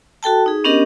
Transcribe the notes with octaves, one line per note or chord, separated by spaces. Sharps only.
F#4 A4 G5 A5
D#4 G#4
B3 C#4 D4 G4 A#4 D#5